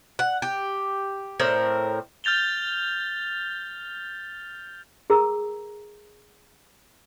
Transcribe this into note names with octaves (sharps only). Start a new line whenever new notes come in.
F#5
G4
A2 C4 A#4
F6 G6 A6 F7 G7
G#4 A#4 A#5 D#6 E6